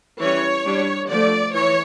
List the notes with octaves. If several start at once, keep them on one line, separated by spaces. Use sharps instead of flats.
E3 G3 C#4 C#5
G3 D4
D3 F3 A3 D5
E3 C#5